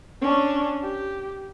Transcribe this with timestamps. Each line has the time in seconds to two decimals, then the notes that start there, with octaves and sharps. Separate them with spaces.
0.21 C#4 D4
0.83 G4